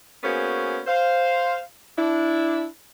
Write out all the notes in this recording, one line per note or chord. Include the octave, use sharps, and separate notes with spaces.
A#3 B3 C#4 F#4 G#4 C5
C5 F5
D4 E4